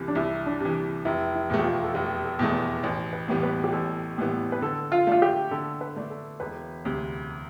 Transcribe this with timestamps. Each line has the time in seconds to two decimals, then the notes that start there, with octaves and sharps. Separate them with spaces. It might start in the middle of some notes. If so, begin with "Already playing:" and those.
Already playing: C2 C3 E3
0.08 D4
0.15 C2 E4
0.46 D4
0.60 C3 E3
1.05 F1 E4
1.35 E4
1.50 E2 B2 A3
1.59 G4
1.64 F4
1.83 A4
1.94 F1 G4
2.25 A4
2.39 E2 B2 A3
2.54 B4
2.83 A1 B4
3.13 B4
3.28 A2 E3 G3 B3
3.43 B4
3.64 G4
3.72 A1 A4
4.18 A2 E3 G3 B3
4.52 B4
4.61 D3 A4
4.92 F4
5.07 A3 D4 F4
5.22 G4
5.51 D3 A4
5.81 B4
5.96 A3 D4
6.10 A4
6.40 E1 B4
6.85 D2 C3